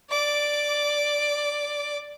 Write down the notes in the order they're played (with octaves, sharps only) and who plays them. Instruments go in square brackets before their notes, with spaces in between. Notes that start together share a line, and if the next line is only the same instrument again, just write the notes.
[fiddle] D5 D6